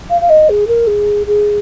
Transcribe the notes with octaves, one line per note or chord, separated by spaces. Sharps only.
F5
F5
D#5
G#4
A#4
G#4
G#4